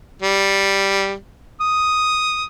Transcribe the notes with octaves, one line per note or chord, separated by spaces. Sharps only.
G3
D#6